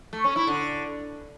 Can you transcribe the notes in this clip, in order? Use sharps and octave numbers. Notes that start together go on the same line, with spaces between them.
A3
C#4
E4
D3